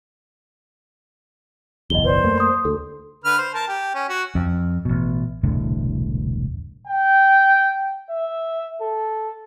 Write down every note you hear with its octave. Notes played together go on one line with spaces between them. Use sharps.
F#1 B1 E2 D#5 G7
B4 C5 D5
F#2 A3 A#3
C6 D#6
D2 A4
D3 B4 F6
C5
A#4 A5
G4
C#4
F#4
F2
A1 B2
E1 C2 A2 D3
G5
E5
A4